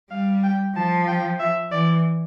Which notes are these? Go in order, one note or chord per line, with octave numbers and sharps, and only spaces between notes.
G3 F5
G5
F3 A5
G5
E5
E3 D5